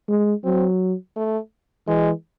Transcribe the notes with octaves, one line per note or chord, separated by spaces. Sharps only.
G#3
F#3 C4
A3
E3 G#3